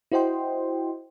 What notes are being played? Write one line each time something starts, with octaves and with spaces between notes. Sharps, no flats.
E4 F#4 C5 D#5 G5 C6